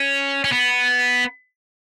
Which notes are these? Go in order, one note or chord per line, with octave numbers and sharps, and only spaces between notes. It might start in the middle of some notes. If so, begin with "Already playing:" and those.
Already playing: C#4
C#4
B3